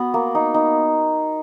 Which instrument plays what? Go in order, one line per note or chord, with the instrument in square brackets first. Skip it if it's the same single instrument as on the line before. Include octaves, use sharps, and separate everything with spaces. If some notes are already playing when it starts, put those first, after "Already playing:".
Already playing: [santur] B3 F#4
A#3
D#4
D#4